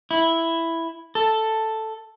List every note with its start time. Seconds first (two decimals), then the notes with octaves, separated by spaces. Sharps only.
0.11 E4
1.15 A4